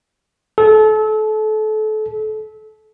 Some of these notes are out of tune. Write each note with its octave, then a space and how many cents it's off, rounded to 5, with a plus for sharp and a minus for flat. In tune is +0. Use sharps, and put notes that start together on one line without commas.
A4 -30